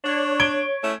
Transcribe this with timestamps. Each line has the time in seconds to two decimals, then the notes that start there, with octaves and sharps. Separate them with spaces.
0.04 D4 C#5
0.40 G#6 D7 G7
0.83 A3 C#4 E4